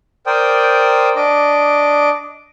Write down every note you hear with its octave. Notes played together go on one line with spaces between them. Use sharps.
A#4 C5 D5 G5 D#6
D4 D#5 D6